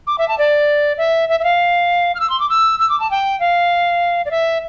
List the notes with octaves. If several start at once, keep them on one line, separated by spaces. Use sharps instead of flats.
D6
E5
A5
D5
E5
E5
E5
F5
F6
E6
C6
D6
E6
E6
D6
A5
G5
F5
D5
E5